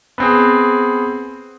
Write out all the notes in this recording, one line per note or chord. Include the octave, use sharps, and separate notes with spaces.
B3 C4 G#4